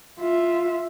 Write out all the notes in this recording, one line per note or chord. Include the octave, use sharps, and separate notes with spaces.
F4 E5